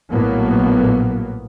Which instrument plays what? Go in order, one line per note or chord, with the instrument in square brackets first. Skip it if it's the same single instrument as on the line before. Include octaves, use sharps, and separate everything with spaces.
[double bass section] A#1 A2 F#3 A#3 B3